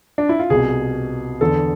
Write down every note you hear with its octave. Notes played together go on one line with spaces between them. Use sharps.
D4
E4
F4
C2 B2 G#4
E2 D3 A4